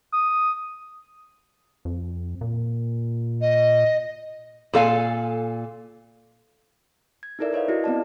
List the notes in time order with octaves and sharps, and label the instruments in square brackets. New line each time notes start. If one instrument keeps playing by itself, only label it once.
[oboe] D#6
[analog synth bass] F2
A#2
[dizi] D#5
[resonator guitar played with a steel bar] A#2 A4 F5 G#5
[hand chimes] G#6
D#4 E4 A4 A#4 D5 E5
B4 C#5 D#5 F5
E4 F#4 D#5
B3 C4 D5 A5